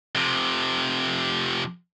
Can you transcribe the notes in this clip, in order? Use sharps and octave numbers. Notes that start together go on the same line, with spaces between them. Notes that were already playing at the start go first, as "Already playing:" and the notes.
F2 C3